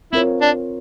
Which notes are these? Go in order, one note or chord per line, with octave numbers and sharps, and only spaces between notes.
C4 E4 F4 A#4 C#5
D4